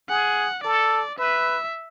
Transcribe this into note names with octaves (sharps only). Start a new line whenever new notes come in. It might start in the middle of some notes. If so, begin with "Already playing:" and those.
G#4 F#5
A4 D5
B4 E5